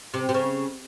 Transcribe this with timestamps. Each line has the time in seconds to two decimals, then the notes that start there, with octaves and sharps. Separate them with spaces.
0.14 C3
0.29 C3
0.34 C#3